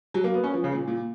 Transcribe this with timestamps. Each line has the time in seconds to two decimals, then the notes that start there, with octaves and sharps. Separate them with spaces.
0.14 F#3
0.24 A#3
0.34 B3
0.44 C#4
0.54 F3
0.64 C#3
0.73 A#2
0.88 A#2